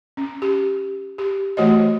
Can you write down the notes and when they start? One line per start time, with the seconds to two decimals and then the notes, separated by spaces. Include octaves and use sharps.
0.17 C#4
0.42 G4
1.18 G4
1.57 E3 A3 F#4 C#5 D#5